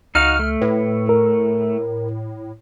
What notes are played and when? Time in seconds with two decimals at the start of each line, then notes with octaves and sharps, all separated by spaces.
0.15 C#2 D#4 F#4 F5 F6
0.39 A3
0.61 A2 B4
1.09 A#4